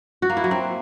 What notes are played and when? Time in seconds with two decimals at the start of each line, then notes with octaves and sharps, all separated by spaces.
0.22 F#4
0.29 A#3
0.37 E4
0.44 F#3
0.51 C4